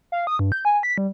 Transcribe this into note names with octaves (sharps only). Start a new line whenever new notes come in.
F5
D#6
G2
G6
G#5
B6
G3